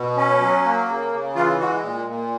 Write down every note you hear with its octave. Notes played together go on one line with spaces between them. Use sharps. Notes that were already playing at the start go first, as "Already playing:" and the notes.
Already playing: B2
C#4
F#3
A#3
C#3
C#3
E3 F4
G#3 F#4
A#2
A#2